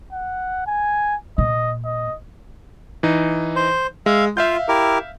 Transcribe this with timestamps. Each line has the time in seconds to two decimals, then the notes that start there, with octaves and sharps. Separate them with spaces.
0.13 F#5
0.67 G#5
1.38 A#2 D#5
1.85 D#5
3.03 E3 D#4
3.56 C5
4.06 G#3 E5 F5
4.37 F4 E5 F5 G6
4.69 E4 G4 A#4